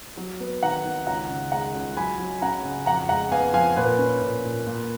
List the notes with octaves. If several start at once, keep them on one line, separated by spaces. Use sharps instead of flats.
F#3
B3
D#3 F#5 A#5
D#3
C#2 F#5 A#5
C#3
G#3 F#5 A#5
C#2
F#3 G#5 B5
F#3
C#4 F#5 A#5
C#3
F2 F#5 A#5
G#3 F#5 A#5
B3 F5 G#5
F3 F5 G#5
A#2 B4
C#4
A#2
A#2
A#2